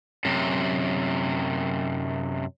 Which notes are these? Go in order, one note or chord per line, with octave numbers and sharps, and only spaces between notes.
F#2 C3